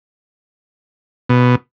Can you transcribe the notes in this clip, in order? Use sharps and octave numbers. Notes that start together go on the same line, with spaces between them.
B2